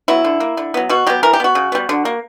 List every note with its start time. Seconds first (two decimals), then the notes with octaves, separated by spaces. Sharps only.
0.08 F#3 B3 E4
0.24 D3
0.40 A#3
0.57 D3
0.74 F#3 B3
0.89 B2 F#4
1.07 F#3 B3 G4
1.23 E3 A#4
1.33 G4
1.40 B3 F#4
1.55 C#3
1.72 G3 B3
1.89 D3
2.05 A#3